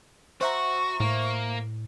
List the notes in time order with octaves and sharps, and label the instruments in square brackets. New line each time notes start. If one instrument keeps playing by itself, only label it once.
[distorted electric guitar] F#4 [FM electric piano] C5 E5 A#5 [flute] C#6
[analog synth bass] A2 [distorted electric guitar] A#3